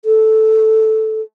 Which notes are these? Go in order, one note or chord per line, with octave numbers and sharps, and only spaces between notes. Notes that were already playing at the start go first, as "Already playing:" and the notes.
A4